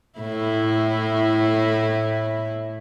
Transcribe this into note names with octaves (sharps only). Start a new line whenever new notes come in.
A2 E4